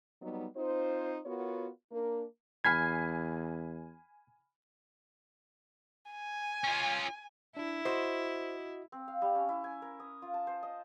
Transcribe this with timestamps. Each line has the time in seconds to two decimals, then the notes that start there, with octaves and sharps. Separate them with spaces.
0.22 F#3 G3 B3 D#4
0.56 C4 D#4 F4 C5
1.25 B3 F4 F#4 A#4 C#5
1.91 A#3 D4 A#4
2.64 E2 G#5 B5 F6 G#6 B6 C7
6.12 G#5
6.64 C#4 F4
7.57 D4 E4
7.85 F#4 C5 D#5
8.92 C4
9.08 F5
9.22 G3
9.35 C#4
9.49 E4
9.64 G#5
9.82 A#4
10.00 D#6
10.22 F4
10.34 A5
10.47 C5
10.63 D#5